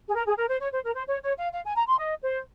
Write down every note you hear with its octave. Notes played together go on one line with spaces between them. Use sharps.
G#4
A#4
G#4
A#4
C5
C#5
C5
A#4
C5
C#5
C#5
F5
F5
G#5
A#5
C6
D#5
C5